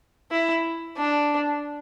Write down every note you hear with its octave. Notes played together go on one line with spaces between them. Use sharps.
E4
D4